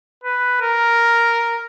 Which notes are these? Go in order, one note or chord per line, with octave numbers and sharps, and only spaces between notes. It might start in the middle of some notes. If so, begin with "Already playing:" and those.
B4
A#4